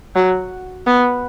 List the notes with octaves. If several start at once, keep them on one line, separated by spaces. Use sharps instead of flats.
F#3
B3